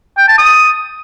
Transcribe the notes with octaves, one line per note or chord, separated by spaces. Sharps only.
G5
A5
D#6